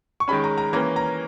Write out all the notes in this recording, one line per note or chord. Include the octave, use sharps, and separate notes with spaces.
C#6
D#3 G#3 C#4 B5
A#5
A#5
E3 A#3 C#4 A#5
A#5